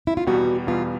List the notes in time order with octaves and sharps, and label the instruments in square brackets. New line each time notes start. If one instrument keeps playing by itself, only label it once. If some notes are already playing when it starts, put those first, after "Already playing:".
[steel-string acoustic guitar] E4
F4
[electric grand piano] E2 B2 G3 B3 [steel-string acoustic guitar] F#4
[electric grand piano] E2 B2 G3 B3 [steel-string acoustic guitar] F4